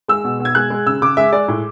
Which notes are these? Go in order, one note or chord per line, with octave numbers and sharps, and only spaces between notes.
G#3 E6
B2
B2
G#6
G#3 F#6
G#3
C#3 E6
C#3 D6
G#3 E5
G#3 D5
A2